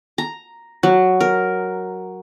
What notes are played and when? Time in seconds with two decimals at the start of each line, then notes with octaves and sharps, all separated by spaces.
0.18 A#5
0.83 F#3
1.21 A#4